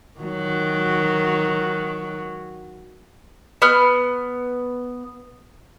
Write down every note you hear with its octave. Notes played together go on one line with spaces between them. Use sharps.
D#3 F#3
B3 F6